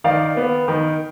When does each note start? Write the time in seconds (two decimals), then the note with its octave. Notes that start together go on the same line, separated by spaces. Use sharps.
0.04 D#3 D5 F5
0.37 B3
0.68 D#3